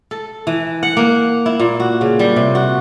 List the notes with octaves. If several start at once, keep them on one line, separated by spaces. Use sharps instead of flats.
A4
E3
F#5
A#3
E4
A#2
F#4
C#3
G3
C3
F#4